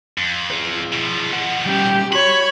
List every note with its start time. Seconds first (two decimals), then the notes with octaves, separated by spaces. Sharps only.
0.18 F2
0.50 G#4 B4
0.93 B2 F3
1.33 F#5
1.66 G3 C#4 G4
2.13 F#4 C#5 B5